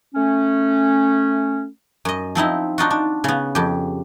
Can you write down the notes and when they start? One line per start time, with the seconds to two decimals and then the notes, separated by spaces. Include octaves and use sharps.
0.15 A3 C#4
2.05 F#2 D#5
2.35 F3 C4 D#4 E4
2.78 D4 D#4 F4 F#4
2.91 D4
3.24 C#3 B3
3.55 F2 G4